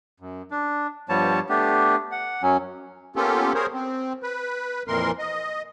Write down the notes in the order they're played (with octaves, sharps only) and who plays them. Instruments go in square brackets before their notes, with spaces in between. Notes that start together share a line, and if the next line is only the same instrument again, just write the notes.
[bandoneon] F#2
D4
G2 F3 G3 B3 C#5 A5
A3 B3 D4 G4
F#5
F#2 F#3 C#4
[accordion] A#3 B3 C#4 F4 G4 A4
G#4 A#4 C5 C#5
C4
B4
F2 A#2 E3 A#4 C6
D#5